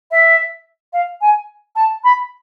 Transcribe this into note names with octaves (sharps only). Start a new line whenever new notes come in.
E5
F5
G#5
A5
B5